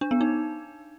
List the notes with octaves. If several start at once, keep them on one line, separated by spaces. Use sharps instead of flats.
D4
B3
D#4